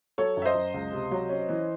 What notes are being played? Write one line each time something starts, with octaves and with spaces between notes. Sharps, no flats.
F#3 A4 C#5
F#2 E5
C5 D#5
F#2
C#2
C3
F#3
C#4
E3